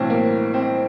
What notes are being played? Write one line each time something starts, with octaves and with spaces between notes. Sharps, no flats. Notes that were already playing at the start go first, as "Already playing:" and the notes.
Already playing: B1 A2 E3 C4
A#3
C4